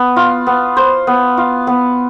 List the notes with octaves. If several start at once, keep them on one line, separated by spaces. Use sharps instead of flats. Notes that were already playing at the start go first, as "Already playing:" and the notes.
Already playing: B3
F4
B3
C5
B3
F4
B3